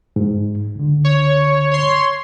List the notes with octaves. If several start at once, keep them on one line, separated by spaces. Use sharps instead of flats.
G#2
C#2 D3
C#5
C#5 C6